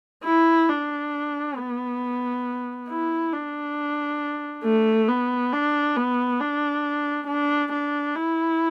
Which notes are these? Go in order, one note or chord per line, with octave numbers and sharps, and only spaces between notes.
E4
D4
B3
E4
D4
A3
B3
D4
B3
D4
D4
D4
E4